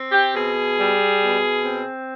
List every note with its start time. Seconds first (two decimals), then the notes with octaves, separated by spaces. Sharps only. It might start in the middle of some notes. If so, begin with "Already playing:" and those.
Already playing: C4
0.11 G4
0.33 B2 G#4
0.76 G3
1.20 B2
1.63 C4